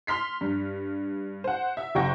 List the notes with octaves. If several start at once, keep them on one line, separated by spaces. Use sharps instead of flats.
C6 F6 B6 C7
G2
C5 F#5
E5
F#1 F#4 G5 C#6 A#6